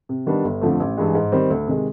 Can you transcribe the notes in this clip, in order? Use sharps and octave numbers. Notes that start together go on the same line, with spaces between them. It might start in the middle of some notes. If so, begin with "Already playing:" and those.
C3
D#3 G3 B3 D4
G1
F2 D3 F3 A3
A1
G2 E3 G#3
G#2
D#3 G3 C4
D2
C3 D#3 G#3